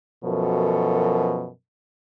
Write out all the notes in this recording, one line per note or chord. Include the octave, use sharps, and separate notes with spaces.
F#2 B2 F3 A4 A#4